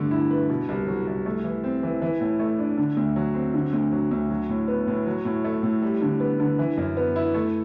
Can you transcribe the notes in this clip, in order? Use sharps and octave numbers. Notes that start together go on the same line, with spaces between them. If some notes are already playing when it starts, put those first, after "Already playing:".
Already playing: G2 D3 A3
E4
B4
B2
C2
F#3
C2
A3
E3
C4
E3
E3
A2
A3
D4
D3
D2
F#3
C4
D3
D2
F#3
D2
F#3
A2
B3
A2
F#3
A2
A3
A2
G3
D3
B3
D3
E3
F#2
B3
E4
A3